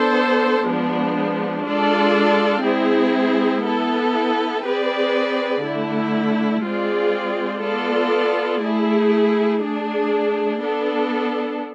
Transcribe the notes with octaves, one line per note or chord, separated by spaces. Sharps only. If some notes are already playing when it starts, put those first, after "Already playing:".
Already playing: B3 D4 A4 C5
F3 G#3 B3 D4
G#3 D4 F4 A4 D5
G#3 C4 E4 G#4
B3 E4 A4
C4 G#4 B4 D5
D3 A3 E4
G#3 C4 F4 G#4 D5
B3 F4 A4 D5
A3 E4 G#4
A3 D4 G#4
B3 D4 A4